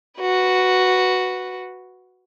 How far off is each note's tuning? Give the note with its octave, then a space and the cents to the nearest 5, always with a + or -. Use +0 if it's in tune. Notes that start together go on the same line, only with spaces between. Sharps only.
F#4 +0 B4 +0